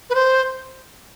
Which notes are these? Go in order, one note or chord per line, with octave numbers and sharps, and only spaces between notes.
B4
C5